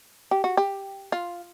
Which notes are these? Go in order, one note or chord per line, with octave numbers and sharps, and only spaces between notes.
G4
F#4
G4
F4